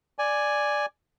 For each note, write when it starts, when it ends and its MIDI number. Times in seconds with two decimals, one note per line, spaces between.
0.19 0.86 74
0.19 0.86 80